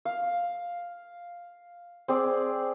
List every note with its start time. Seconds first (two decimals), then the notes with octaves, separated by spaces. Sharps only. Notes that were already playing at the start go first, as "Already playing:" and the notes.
0.05 F5
2.08 C4 G#4 D5